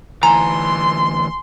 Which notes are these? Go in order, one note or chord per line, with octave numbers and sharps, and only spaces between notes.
D2 E3 G#5 A#5 C6